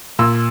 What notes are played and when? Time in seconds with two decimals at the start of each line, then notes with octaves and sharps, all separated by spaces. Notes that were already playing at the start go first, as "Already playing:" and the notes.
0.19 A#2 E6